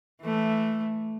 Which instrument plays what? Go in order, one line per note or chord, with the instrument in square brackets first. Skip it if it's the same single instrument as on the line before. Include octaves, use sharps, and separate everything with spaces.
[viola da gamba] E3 A3